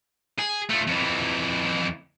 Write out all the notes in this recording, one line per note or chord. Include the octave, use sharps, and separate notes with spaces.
G#4
A3 F4
F2 E3